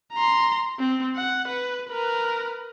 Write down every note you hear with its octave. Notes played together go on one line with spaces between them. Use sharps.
A#5 C6
C4
F#5
B4
A#4 B4